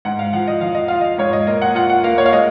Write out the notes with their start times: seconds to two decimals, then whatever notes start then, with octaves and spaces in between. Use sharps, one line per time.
0.05 G#2 F#5
0.19 F5
0.33 F3 F#5
0.48 D#5
0.61 F3 F5
0.75 D#5
0.88 F4 F5
1.01 D#5
1.18 G#2 C#5
1.33 D#5
1.47 A#3 D#5
1.62 F#5
1.75 F4 F#5
1.89 F#5
2.03 A#3 F5
2.18 C#5
2.26 F5
2.33 G#3 D#5